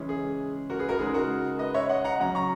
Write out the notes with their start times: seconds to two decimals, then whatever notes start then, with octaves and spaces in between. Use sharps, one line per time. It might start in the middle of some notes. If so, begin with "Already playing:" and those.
Already playing: C#3 E3 G#3 C#4
0.09 G#4
0.70 F#4 A#4
0.79 G#4 B4
0.89 F#4 A#4
0.99 C#3 G#3 D#4 G#4
1.14 F#4 A#4
1.59 B4 D#5
1.74 C#5 E5
1.89 D#5 F#5
2.05 F#5 A#5
2.20 C#3 F#3 C#4 F#5 A#5
2.35 A#5 C#6